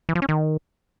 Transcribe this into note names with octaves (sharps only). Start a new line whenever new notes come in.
E3
F3
C#4
D#3